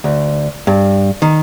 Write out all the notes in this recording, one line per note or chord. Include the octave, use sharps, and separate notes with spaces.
D2
G2
D#3